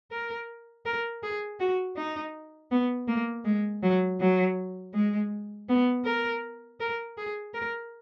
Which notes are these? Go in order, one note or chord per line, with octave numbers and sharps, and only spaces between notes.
A#4
A#4
G#4
F#4
D#4
B3
A#3
G#3
F#3
F#3
G#3
B3
A#4
A#4
G#4
A#4